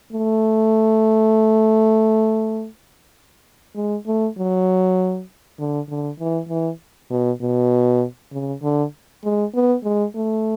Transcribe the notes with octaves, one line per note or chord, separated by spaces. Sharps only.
A3
G#3
A3
F#3
D3
D3
E3
E3
B2
B2
C#3
D3
G#3
B3
G#3
A3